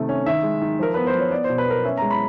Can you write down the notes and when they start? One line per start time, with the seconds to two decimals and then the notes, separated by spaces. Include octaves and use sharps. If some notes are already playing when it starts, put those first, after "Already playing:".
Already playing: C3 D#3 A3
0.09 C#4
0.26 D#3 E5
0.43 G#3
0.61 D#3
0.79 F3 A#4
0.94 B3 B4
1.07 C5
1.13 F3
1.20 C#5
1.31 B3 D5
1.44 C5
1.49 B2
1.58 B4
1.67 B3 A#4
1.85 C#4 E5
1.98 A#5
2.02 G#3
2.11 B5